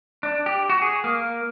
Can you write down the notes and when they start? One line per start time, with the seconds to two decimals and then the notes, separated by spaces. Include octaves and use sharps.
0.23 D4
0.46 G4
0.69 F#4
0.82 G#4
1.04 A#3